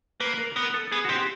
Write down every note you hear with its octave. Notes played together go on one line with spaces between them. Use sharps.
A#3 B4
A#4
B3 A#4
A4
B3 G#4
F#4
C4 G4